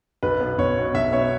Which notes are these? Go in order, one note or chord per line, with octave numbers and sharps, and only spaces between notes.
B1 B4
B2 B3
B1 C#5
B2 B3
B1 E5
B2 B3 C#5